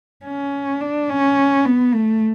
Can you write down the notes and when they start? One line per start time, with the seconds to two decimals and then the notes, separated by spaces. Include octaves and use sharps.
0.25 C#4
0.81 D4
1.09 C#4
1.65 B3
1.94 A3